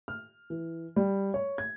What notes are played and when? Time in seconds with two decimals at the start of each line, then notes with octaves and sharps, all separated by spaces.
0.08 F6
0.50 E3
0.96 G3
1.34 C#5
1.58 G#6